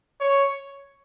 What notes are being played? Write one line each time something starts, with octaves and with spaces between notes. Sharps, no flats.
C#5